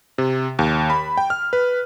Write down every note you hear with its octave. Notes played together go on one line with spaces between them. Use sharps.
C3
D#2
B5
G5
F6
B4